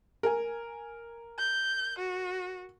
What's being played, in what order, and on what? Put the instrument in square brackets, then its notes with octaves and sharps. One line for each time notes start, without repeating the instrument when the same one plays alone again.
[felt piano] A#4 G#5
[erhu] G6
F#4